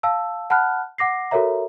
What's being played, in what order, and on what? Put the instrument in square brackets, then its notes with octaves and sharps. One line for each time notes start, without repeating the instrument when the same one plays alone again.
[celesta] F5 A5 E6
F#5 A5 B5 F6 F#6
F#5 D6 A#6 C7
F#4 A4 A#4 C#5 E5 A#5